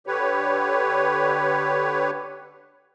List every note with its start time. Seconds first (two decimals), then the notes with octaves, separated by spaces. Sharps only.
0.07 D3 G4 B4 C#5